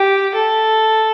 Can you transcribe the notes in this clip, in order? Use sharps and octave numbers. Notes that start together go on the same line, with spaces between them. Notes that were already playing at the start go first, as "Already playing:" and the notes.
Already playing: G4
A4